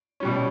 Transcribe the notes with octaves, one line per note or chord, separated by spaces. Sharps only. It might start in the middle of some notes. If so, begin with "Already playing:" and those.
B2 G3 C#4